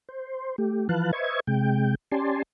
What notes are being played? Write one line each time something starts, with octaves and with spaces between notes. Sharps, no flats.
C5
A3 G4
E3 F3 B4 F5 A5 F#6
B4 C5 D#5 E5 C#6 G#6
C3 G#3 G5
C#4 G4 D5 G#5 A5 C6